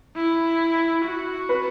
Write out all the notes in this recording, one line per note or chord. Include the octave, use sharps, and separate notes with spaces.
E4
F#4
B4